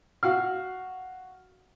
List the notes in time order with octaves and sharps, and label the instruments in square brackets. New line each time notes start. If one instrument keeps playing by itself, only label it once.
[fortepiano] F#4 F5 F6